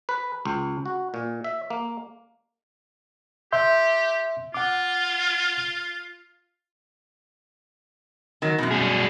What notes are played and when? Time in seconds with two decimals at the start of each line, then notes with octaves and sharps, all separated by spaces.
0.09 B4
0.45 C#2
0.86 F#4
1.14 A#2
1.44 E5
1.70 A#3
3.52 G4 E5 C6 G6
4.54 F4 F#5 D6
8.42 D#3 F#3
8.58 F#2 B2
8.72 G3 G#4